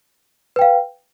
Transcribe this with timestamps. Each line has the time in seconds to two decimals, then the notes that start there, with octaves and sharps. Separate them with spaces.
0.56 B4
0.59 G5
0.61 F5